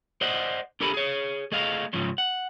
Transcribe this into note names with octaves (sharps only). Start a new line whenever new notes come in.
C5 D5 D#5 F#5
D4 G4 A4 A#4 G#5 B5
G#4 C#5
A3 G#4 D#5 F5
G#2 C#3 F3 F#3
F#5